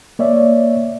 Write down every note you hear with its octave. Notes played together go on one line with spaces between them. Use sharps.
A#3 C#5 D5 E5